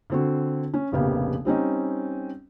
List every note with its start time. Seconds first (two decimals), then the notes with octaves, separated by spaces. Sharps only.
0.10 D3 C4 F#4
0.74 C#4
0.92 F1 A#1 C#3 A#3 B3 G4
1.45 G3 C4 C#4 D#4